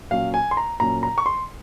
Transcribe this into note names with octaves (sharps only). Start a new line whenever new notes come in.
A#2 F#3 C#4 F5
G#5
C6
A#5
A#2 F#3 C#4 A#5
A#5
C#6
C6